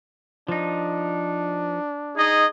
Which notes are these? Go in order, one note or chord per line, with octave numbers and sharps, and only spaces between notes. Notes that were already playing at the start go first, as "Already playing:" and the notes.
F3 D4 D#4
D#4 G#4 D#5